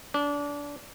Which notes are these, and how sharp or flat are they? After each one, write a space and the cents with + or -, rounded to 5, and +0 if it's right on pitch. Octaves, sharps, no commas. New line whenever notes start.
D4 -25